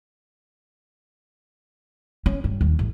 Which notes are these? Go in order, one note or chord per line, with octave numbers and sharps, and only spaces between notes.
C#4
G2
D#2
A1